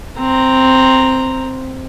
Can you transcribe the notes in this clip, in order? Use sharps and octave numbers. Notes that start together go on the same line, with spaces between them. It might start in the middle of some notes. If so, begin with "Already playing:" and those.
C4 A#5